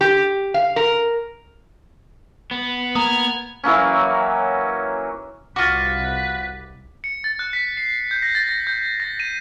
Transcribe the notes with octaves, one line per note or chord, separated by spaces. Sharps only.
G4
F5
A#4
B3
A#3 A#5 D#6 F6 G#6
E3 F#3 A#3 C#4
C2 C3 F4 F#4 B4 D6 A6
C#7
A6
F#6
B6
C7
G6
A#6
A6
A#6
G6
A#6
D#7